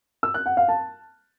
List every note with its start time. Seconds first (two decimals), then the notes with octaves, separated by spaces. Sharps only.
0.23 E6
0.34 F#6
0.46 F#5
0.57 F5
0.68 A5